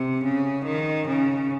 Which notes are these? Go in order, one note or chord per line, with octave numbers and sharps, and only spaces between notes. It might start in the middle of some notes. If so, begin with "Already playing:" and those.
Already playing: C3
C#3
D#3
C#3